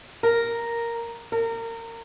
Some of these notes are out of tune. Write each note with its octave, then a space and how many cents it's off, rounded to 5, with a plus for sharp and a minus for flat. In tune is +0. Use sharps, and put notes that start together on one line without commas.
A#4 +0
A#4 -25